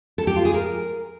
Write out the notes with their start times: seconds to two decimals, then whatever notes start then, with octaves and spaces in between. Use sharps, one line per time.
0.18 A4
0.27 G4
0.36 F4
0.45 G#4
0.54 A#4